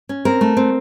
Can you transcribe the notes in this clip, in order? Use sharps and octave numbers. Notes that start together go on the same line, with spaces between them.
C#4
C4 A#4
A3
C4